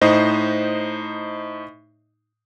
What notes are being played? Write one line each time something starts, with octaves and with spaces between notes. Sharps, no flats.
A2 D#4 C5 D#5